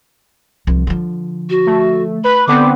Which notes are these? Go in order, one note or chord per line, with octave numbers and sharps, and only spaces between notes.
C2 F3
D3 F3
F#4
A3
B4 B5
D3 B3 C4 D6